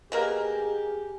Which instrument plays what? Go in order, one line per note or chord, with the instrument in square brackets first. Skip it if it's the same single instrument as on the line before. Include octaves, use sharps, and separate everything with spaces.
[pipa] B2 A#3 A#4 [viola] G4 [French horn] G#4